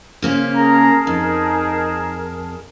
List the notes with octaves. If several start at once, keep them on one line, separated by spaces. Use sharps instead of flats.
C#3 A#3 C#4 C5
G#4 A#4 A5 A#5
F2 D#4